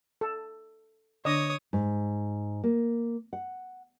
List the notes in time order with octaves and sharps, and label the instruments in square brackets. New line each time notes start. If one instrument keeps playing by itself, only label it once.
[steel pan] A4
[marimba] D3 D4 [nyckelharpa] C#5 D#6 [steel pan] D#5
[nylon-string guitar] G#2
A#3
F#5